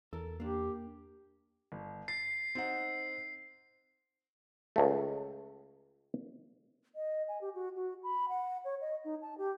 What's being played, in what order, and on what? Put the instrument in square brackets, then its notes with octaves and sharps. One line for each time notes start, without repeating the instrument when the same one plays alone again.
[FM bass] E2 [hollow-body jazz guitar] A4 A#4
[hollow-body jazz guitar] A#3 D4 [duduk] G4
[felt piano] G1
[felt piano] A6 [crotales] C7
[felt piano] C4 D#4 F#5
[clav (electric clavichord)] C#2 A3
[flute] D#5
G#5
G4
F#4
F#4
B5
F#5
C#5
D#5
D#4
A5
G4